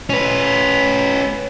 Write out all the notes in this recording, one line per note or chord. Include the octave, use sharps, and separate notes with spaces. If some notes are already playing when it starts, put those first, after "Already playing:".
C#4 B4